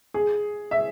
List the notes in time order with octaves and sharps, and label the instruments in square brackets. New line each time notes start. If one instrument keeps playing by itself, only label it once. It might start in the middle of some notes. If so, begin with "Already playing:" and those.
[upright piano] G#4
E5